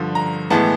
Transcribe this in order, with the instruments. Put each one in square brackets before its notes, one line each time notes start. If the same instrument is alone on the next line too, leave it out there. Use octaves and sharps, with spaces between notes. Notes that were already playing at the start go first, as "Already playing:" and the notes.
Already playing: [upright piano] G2 D3 F3
A#5
A2 E3 G#3 B3 A5